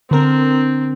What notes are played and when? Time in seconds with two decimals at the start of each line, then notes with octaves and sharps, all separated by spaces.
0.11 D3 C4 A#4